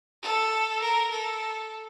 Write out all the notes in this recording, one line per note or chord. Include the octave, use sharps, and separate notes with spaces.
A4
A#4
A4